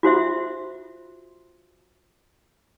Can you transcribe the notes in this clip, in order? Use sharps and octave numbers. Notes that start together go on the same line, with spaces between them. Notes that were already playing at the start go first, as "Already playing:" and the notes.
F4 F#4 C5 E5